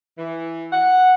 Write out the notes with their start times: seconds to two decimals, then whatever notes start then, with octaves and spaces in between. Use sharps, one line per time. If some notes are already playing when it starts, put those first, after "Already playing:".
0.18 E3
0.72 F#5